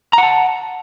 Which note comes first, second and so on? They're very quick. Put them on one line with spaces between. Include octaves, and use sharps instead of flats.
A#5 F#5 A5